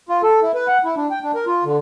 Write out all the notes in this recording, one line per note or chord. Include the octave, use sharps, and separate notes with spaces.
F4
A4
E4
B4
F#5
E4
D4
G5
D4
A#4
F4
D3